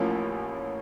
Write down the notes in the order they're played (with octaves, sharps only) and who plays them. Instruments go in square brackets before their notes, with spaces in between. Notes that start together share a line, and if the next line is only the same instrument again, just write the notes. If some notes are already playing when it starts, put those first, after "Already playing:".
Already playing: [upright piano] A1 A2 F3 A#3 C#4